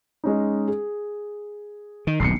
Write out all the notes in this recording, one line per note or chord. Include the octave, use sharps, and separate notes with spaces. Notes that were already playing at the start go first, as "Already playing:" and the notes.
G#3 C#4 D#4
G#4
D#3
D#1 B1 G2 C7 C#7